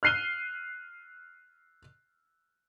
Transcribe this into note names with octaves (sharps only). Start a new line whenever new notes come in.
F6 F#6 C7 D#7 G7